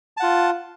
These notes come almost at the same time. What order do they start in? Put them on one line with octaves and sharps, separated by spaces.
A5 F#5 F4